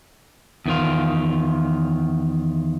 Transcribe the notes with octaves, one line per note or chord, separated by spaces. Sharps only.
E2 D#3 F4